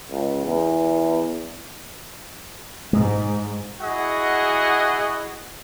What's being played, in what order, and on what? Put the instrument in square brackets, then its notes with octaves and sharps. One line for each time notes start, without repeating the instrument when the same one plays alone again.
[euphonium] C#2
E2
[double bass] G#2 [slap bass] G#3
[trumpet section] E4 F#4 G#4 D#5 F#5